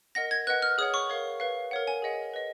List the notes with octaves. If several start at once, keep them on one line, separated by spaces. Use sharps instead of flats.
A#4 D#5 F#5 A#6
G#6
B4 D#5 F#5 F#6
F6
G#4 C#5 F#5 D#6
C#6
A#4 C#5 F5
B4 F5
A#4 C#5 F#5
G#5
G#4 D#5 F#5
B4 D#5